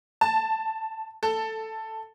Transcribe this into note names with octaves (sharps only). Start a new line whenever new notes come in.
A5
A4